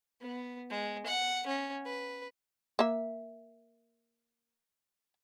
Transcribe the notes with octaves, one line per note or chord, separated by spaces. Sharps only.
B3
G#3
F#5
C#4
B4
A#3 E5